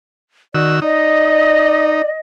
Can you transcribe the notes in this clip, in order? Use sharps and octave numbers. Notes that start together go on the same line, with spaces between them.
D#3 F#4 D5 E6
D#4 D5 D#5